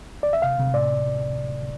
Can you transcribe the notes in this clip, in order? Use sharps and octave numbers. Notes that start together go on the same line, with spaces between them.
D5
E5
C3 F5
C3
A2 D5